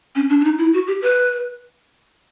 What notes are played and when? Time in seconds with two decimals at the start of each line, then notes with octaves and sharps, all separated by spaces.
0.15 C#4
0.30 D4
0.40 D4
0.44 D#4
0.59 E4
0.74 F#4
0.87 G4
1.02 B4